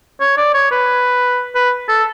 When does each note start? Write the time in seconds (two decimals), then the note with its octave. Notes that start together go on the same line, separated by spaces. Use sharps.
0.21 C#5
0.38 D5
0.54 C#5
0.71 B4
1.55 B4
1.89 A4